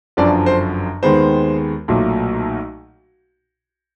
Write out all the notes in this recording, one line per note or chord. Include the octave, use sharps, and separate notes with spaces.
G1 F#2 D3 F3 D5
C5
D#2 D#3 G#3 B3 C5
B1 A#2 F#3 A3